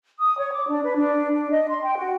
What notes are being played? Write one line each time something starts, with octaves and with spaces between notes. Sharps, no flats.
D#6
C#5
D6
D4
B4
D4
D4
D#5
C6
G5
F#4